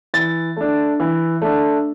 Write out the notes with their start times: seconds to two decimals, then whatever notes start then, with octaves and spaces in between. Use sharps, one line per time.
0.14 E3 A6
0.57 A3 D4
1.00 E3
1.42 A3 D4